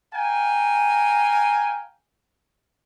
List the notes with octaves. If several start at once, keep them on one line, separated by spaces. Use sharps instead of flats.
F5 G5 G#5 A#5